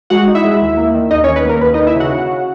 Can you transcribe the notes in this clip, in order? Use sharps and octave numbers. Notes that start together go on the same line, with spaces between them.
G#3 F#4 F#5
D#4
E4 E5
G#3
D#2
A#3
D#3
D#2 D#4 D#5
C#4 C#5
D#3
B4
A#3 A#4
D#2 B4
D#2 D#4 D#5
E4 E5
C#3 F#4 F#5
C#3